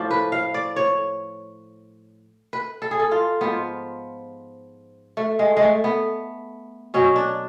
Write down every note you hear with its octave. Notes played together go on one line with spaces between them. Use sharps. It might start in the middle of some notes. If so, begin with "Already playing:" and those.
Already playing: A2 F3 D5
B4
F5
D5
C#5
B4
A4
G#4
A4
F4
G#2 F3 B3
A3
G#3
G#3 A3
B3
B2 F#3 C#4
D4